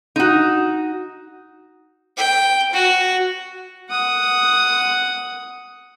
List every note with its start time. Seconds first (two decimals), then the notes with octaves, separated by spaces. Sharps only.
0.16 D#4 F#4
2.17 G5
2.73 F#4
3.90 F#5 D#6